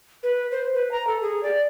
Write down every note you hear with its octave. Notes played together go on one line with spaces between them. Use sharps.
B4
C5
B4
A#5
A4
G#4
D5